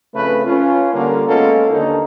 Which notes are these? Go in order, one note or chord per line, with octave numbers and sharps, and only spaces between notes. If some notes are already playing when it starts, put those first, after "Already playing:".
F2 C#3 A3 B4
C#4 F4
D3 G3 A#3
G#3 A#3 B3 C#4 F4 A4
D#2 D3 D#4